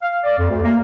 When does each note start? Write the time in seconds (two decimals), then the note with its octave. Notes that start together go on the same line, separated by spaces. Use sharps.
0.01 F5
0.24 D5
0.38 F2
0.50 D2
0.63 A#3